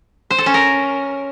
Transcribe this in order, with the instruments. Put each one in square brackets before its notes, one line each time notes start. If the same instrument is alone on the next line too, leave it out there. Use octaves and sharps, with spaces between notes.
[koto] C5
A4
C#4
A#4